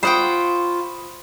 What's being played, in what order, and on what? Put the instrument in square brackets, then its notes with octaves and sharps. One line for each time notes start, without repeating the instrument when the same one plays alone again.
[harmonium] F4 [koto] C5 F#5 G5 [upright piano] B5 C#6 D#6